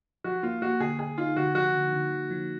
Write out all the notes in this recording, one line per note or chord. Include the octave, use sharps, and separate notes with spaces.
F3 F#4
A#3 F4
A#3 F#4
D3 G#4
D3 G#4
D#4 F4
D3 F#4
F3 F#4
D3
D3
F3
F3